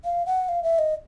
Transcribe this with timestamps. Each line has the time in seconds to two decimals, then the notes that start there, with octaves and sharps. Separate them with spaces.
0.05 F5
0.26 F#5
0.49 F5
0.63 E5
0.79 D#5